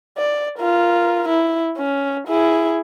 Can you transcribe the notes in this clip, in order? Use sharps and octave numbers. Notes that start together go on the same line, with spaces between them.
D5
F4 A#4
E4
C#4
E4 G#4